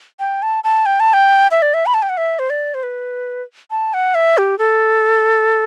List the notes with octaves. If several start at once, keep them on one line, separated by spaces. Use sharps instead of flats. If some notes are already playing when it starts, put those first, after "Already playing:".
G5
A5
A5
G5
A5
G5
E5
D5
E5
B5
A5
G5
F#5
E5
C5
D5
C5
B4
A5
F#5
E5
G4
A4